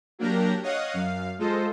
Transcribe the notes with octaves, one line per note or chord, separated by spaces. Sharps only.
F#3 A#3 D4 G4 A#4 A#5
C#5 D#5 F5 F#5 D#6
F#2 F5
G#3 F4 A4 C5 D#5